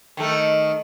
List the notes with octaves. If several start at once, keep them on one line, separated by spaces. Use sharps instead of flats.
D#3 A3